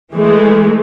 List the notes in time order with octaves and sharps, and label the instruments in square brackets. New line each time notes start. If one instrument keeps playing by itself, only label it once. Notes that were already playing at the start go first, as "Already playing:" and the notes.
[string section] E3 G#3 A3